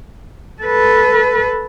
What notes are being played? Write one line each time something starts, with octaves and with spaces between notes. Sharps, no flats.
A4 B4